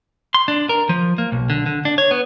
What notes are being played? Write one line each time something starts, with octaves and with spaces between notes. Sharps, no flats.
C6
D4
A#4
F3
A#3
B1
D3
D3
D4
C#5
B3